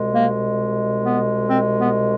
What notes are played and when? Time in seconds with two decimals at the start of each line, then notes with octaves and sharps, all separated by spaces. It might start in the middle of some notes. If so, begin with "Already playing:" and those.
Already playing: C2 B2 G#3
0.13 A#3
1.04 B3
1.49 C4
1.79 B3